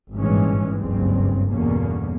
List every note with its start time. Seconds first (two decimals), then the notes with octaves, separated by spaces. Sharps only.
0.15 G#1 G2 A#2 E3 G#3 C#4
0.78 F#1 C#2 G2 C#3 C4
1.52 E2 G2 B2 D3 A#3 C#4